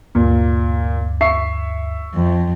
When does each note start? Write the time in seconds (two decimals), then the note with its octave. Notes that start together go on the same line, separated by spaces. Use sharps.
0.15 D2 G2 A#2
1.21 E5 C#6 C7
2.13 F2